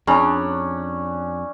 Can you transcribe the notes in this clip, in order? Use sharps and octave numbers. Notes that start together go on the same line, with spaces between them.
F2 C#4 D4 G#4 A#5 B5